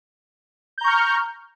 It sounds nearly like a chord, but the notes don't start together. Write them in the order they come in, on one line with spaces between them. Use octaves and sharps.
G6 A#5 C#6 F6